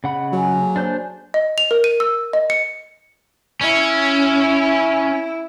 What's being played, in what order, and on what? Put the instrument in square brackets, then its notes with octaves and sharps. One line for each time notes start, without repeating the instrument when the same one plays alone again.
[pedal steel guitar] C#3 F#5 B5 [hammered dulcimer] D#5
[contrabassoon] F#3 [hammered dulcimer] G#4 C#5 F5
[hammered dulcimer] A#3 A4
[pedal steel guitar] D4 C5 G6 [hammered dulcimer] B4 D5 G#5
[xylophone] D#5
F7
A#4
D#7
E6
D#5
C#7
[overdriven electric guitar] C#4 [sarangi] E4